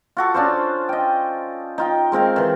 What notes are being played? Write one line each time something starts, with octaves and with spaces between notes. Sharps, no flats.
F4 F#4 A4
C#4 D4 F4 C5
D#5 G5
D#4 F4 G5
G#3 C4 A#4 F5
D#3 E3